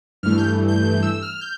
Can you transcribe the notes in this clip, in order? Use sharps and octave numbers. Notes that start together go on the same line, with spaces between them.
G2 E3 A3 F6
G6
G6
G6
E6
F6
G6